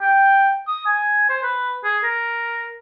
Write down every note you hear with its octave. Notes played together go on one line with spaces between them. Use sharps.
G5
D#6
G#5
C5
B4
G#4
A#4